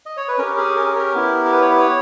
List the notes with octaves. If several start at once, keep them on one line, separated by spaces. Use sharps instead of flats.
D#5
C#5
B4
C#4 G4 A#4
G#4
A#4
G#4
A#4
B3 E4 G4
A#4
B4
C#5
B4
C#5